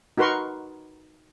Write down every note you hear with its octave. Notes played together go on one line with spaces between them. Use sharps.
D#4 F#4 A#4 B4 C6 C#6